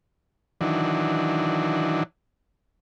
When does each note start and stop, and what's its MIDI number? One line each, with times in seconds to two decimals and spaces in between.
0.61 2.03 51
0.61 2.03 52
0.61 2.03 54
0.61 2.03 62